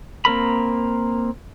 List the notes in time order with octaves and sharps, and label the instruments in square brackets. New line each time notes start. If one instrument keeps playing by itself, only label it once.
[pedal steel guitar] A#3 C4 A#4 B5